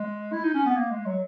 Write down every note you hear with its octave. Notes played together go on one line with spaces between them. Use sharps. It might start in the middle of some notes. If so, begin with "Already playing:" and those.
Already playing: G#3
E4
D#4
C#4
B3
A#3
G#3
F#3